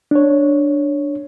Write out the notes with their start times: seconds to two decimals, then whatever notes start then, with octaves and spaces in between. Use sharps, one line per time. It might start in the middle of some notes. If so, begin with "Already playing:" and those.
0.11 D4 C#5